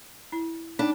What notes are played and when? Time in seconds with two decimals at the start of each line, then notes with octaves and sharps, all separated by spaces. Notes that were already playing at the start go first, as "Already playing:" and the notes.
0.32 E4
0.79 D4 D#4 G5